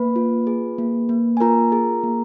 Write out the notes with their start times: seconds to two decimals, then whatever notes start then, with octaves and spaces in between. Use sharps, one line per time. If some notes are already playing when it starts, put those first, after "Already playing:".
Already playing: A#3 B4 B5
0.16 F4
0.47 G#4
0.78 A#3
1.09 A#3
1.37 G#5
1.40 F4 A#4 A#5
1.72 G#4
2.03 A#3